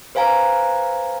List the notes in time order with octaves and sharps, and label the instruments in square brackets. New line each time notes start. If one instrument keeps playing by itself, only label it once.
[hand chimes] B4 C5 F5 G#5 A#5